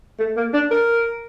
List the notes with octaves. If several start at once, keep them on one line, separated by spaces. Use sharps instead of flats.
A3
A#3
D4
A#4